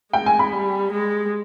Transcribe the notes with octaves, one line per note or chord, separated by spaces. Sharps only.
G#3 G5
G#5
B5
G3
G#3